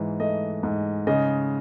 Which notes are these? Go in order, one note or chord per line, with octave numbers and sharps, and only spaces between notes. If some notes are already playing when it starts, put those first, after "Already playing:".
Already playing: G#2 E3
A3 D#5
G#2
C#3 D#5